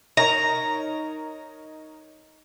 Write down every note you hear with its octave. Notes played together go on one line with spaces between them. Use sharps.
D#4 A#4 C#5 A#5